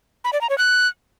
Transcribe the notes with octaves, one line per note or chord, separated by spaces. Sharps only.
B5
D5
A#5
C#5
F#6